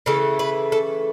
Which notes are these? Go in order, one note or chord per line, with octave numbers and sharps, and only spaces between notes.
C#3 E3 A3 A4
B4
A4